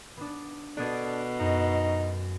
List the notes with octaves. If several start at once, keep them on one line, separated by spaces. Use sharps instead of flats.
B3 D4
B2 D4 A4 D#6 G#6
F#2 D#4